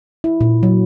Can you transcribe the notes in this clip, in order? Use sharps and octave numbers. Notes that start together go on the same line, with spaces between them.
E4
A#2
F#3